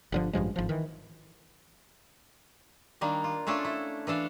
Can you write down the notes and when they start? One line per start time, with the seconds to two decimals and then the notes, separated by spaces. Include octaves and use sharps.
0.12 G1 D3 F3
0.33 A1 G2 F3 G#3
0.56 G#1 F3
0.69 D#3 E3
3.01 D#3 G3 A#3 D4
3.24 F4
3.47 A3 C#4 D4 F4 A4
3.65 E4
4.07 E3 D4 A4 F5